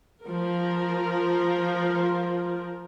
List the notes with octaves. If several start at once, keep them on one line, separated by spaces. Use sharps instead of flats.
F3 F4 A#4